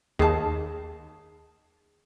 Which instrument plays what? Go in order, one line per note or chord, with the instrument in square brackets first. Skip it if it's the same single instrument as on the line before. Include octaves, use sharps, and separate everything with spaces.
[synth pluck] D#2 [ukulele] G#4 A5